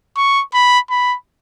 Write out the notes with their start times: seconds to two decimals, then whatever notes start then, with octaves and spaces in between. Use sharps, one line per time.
0.17 C#6
0.54 B5
0.90 B5